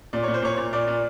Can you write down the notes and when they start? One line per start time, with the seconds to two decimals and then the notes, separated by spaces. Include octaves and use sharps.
0.13 A#2 D5
0.23 A#2 C#5
0.34 C5
0.42 A#2 C#5
0.57 A#2
0.73 A#2 D5
0.87 A#2